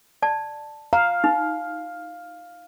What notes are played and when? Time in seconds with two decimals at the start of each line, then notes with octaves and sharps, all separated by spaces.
0.22 D5 A5
0.93 F5 A#5
1.24 D#4